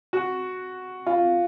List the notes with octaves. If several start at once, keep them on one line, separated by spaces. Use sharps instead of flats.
F#4
F4